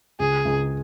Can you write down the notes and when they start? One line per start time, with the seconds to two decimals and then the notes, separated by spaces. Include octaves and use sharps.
0.20 C#2 G#4
0.45 C#2